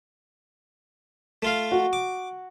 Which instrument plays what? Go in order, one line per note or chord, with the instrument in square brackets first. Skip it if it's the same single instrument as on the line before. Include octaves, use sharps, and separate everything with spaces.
[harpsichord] A3 F4 F5
[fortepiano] F#4
[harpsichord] D6